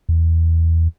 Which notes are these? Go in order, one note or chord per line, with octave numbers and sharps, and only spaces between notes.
E2